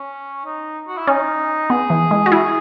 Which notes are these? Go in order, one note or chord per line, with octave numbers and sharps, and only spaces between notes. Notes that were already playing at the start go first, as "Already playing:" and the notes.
Already playing: C#4
D#4
F#4
E4
C#4 D#4
B3 G#4
E3
G#3
F#4
E4